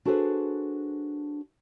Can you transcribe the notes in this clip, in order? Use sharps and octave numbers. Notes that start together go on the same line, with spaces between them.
D4 F#4 G#4 A4 B4 C5